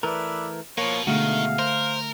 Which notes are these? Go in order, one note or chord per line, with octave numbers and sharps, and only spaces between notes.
E3 A3 A#4 B4 D5 E5
B2 F3 A#3 C#5
B2 D3 D#3 G#3 A3 F#4 F5
A#4 C5